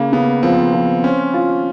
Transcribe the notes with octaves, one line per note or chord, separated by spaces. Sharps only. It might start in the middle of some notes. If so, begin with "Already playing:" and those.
Already playing: C#3 A#3
C#3 B3
F3 C4
F3
C4 C#4
F4